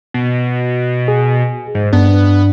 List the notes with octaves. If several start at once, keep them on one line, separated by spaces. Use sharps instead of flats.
B2
G#4
G#2
G2 B3 D4